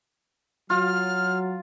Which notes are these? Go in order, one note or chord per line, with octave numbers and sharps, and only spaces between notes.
F#3 F4 F6